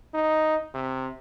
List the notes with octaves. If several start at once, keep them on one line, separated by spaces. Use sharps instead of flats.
D#4
C3